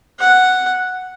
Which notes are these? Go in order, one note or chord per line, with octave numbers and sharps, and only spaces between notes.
F#5